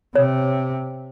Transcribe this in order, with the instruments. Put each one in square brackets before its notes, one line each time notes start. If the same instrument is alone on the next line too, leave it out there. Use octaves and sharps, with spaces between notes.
[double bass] C3 [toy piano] C#5